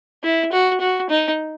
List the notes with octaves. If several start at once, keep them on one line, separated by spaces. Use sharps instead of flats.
E4
F#4
F#4
D#4